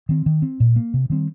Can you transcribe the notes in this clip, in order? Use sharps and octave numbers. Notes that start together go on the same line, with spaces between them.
D#3 C4
D#3
C4
A#2
A#3
C3
D#3 G3 C4